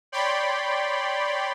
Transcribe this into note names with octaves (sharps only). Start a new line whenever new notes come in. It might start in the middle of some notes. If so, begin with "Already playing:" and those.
C#5 D5 G5 B5 C6